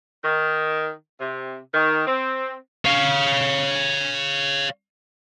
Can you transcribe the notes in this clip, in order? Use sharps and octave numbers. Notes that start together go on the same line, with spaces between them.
D#3
C3
D#3
C4
C#5 F5